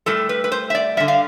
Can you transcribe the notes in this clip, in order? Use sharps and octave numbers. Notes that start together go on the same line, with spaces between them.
A2 G3 A4
B4
B4
C5
E5
D5
D3 G3 E5
F5